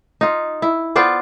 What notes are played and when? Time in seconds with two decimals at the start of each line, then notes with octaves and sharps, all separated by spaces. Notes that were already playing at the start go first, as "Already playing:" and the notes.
0.21 D#4 F4
0.62 E4
0.96 B3 F4 C5 D5